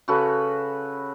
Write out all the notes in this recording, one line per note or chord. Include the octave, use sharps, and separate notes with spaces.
C#3 F#4 A4 B4